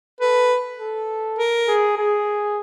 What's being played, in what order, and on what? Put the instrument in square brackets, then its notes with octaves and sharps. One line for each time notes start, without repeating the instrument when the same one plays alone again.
[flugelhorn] A4 [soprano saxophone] B4
[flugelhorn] A4
[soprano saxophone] A#4
[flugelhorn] G#4
G#4